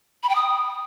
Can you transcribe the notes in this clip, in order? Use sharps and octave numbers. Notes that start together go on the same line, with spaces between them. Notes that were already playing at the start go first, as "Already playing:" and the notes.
B5
G5
D#6